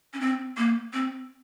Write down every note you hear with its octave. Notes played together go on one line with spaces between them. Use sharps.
C#4
C4
A#3
C4